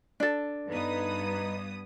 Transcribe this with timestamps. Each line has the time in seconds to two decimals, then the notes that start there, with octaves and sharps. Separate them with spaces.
0.20 D4 A4
0.69 G2 B3 D#4 B4 D#6